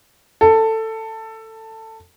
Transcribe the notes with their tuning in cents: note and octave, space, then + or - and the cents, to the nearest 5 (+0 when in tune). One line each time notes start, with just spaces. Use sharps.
A4 +15